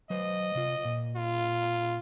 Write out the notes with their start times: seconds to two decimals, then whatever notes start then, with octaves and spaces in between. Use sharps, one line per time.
0.10 F#3 B4 C5 D#5
0.55 C3 F4
0.85 A#2
1.16 F4